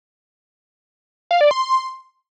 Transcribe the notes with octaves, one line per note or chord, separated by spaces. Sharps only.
F5
D5
C6